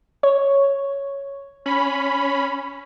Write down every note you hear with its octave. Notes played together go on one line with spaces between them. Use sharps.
C#5
C#4 B5